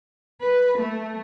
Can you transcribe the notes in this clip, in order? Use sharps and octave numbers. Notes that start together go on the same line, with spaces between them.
B4
A3